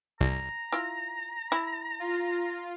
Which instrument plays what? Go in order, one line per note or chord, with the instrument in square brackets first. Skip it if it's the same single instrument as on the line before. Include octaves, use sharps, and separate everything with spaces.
[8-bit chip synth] C2 [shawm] A#5
[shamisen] E4 F4
E4
[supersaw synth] F4